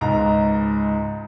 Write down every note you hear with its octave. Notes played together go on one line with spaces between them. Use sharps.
C#2 G#2 A#5